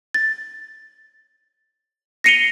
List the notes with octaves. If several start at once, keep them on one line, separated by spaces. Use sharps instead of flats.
A6
A#6 C7 C#7 D#7 F7 G7